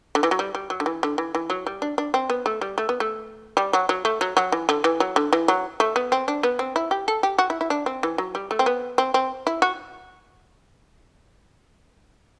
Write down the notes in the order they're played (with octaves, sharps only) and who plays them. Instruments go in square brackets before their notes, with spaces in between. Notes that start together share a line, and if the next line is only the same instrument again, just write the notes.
[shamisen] D3
E3
F#3
G3
G3
F#3
D3
E3
D3
E3
E3
F#3
G3
D4
D4
C4
B3
A3
G3
A3
B3
A3
G3
F#3
F#3
A3
F#3
F#3
E3
D3
E3
F#3
D3
E3
F#3
A3
B3
C4
D4
B3
C4
E4
G4
A4
G4
F#4
E4
E4
D4
C4
E3
F#3
G3
A3
C4
B3
C4
C4
E4
F#4